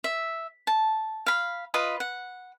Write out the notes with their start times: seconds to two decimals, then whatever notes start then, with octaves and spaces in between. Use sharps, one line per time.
0.04 E5
0.67 A5
1.26 F5 B5
1.74 F4 B4 D#5 B5
2.00 F#5